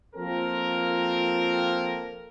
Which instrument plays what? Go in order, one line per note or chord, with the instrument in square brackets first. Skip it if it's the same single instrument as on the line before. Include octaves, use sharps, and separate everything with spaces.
[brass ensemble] F3 A#3 C4 F4 A4 A#4